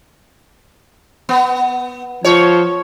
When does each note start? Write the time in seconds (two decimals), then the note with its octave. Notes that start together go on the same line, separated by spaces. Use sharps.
1.29 B3
2.24 F3 C#5